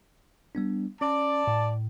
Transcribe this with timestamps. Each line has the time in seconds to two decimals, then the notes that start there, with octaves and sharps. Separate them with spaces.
0.55 G3 B3 D4
1.01 C#4 D5 A5
1.47 A2